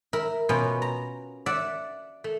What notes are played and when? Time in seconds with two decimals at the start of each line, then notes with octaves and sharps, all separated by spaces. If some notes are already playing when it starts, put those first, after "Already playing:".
0.13 A#4 E5 B5
0.49 B2 B3 C#4 F4
0.82 A#5
1.46 D5 E5 F#5
2.24 A3